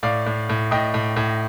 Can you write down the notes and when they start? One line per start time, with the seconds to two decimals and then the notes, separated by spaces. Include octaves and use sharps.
0.03 A2 D5 F5
0.26 A2
0.49 A2
0.71 A2 D#5 G5
0.94 A2
1.16 A2